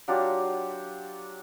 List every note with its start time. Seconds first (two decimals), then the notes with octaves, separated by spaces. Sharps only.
0.08 F#3 D4 F4 G4